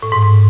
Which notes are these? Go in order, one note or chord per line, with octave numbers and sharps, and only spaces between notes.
A2
G#2
G#2